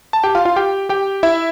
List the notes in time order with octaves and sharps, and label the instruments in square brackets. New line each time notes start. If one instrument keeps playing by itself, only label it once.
[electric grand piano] A5
G4 G5
F4 F5
F4 F5
G4 G5
G4 G5
E4 E5